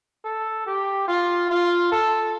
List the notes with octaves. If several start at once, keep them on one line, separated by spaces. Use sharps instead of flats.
A4
G4
F4
F4
A4